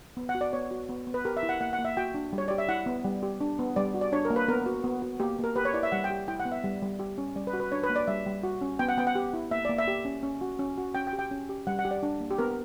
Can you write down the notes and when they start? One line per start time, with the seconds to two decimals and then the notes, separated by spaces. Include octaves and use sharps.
0.17 B3
0.29 F#5
0.35 F#4
0.41 D5
0.53 B3 C#5
0.71 F#4
0.89 B3
1.07 B3
1.14 B4
1.25 G4 A#4
1.37 E5
1.43 E4
1.49 F#5
1.61 A#3 F#5
1.73 F#5
1.79 A#3
1.85 E5
1.97 F#4 G5
2.14 D4
2.33 G3
2.38 C#5
2.48 G4 D5
2.58 E5
2.69 E4 F#5
2.86 B3
3.05 G3
3.23 G4
3.41 D4
3.59 B3
3.76 G3 D5
3.94 F#4
4.01 D5
4.12 D4 C#5
4.25 A#4
4.30 A#3
4.36 B4
4.48 B3 A#4
4.66 F#4
4.84 B3
5.02 F#4
5.20 A#3 G4
5.39 A#3 A#4
5.56 G4 B4
5.65 C#5
5.74 E4 D5
5.83 E5
5.92 G3 F#5
6.04 G5
6.10 G4
6.28 E4 G5
6.40 F#5
6.45 B3
6.52 E5
6.64 G3
6.82 G3
7.00 G4
7.18 C#4
7.36 G3 D5
7.47 B4
7.53 F#4
7.60 B4
7.72 D4 C#5
7.83 B4
7.90 A#3
7.96 D5
8.08 G3 E5
8.26 G3
8.43 F#4
8.62 C#4
8.79 B3 G5
8.89 F#5
8.97 B3 G5
9.07 F#5
9.16 G4
9.33 E4
9.51 A#3 E5
9.65 A#3 D5
9.79 E5
9.88 G4
10.05 C#4
10.23 C#4
10.41 F#4
10.59 C#4
10.78 F#4
10.95 C#4 G5
11.07 G5
11.13 G4
11.19 G5
11.31 C#4
11.49 G4
11.67 G3 F#5
11.79 F#5
11.85 G4
11.91 D5
12.03 D4
12.21 A#3
12.31 G4
12.38 B3 A#4